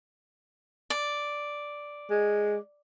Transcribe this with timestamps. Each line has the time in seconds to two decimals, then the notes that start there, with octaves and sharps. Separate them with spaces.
0.90 D5
2.10 G#3